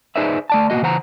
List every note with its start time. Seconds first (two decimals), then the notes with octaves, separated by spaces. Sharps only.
0.16 D#4 G#4 B4 C5 D5 E5
0.50 A3 D5 A5
0.70 B2 F3 A#3 F#4 D#5
0.82 C#3 E3 C5 F#5 A#5